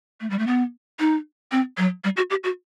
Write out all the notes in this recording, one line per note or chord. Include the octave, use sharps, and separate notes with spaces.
A3
G3
A3
B3
D#4
C4
F#3
G3
F#4
G4
F#4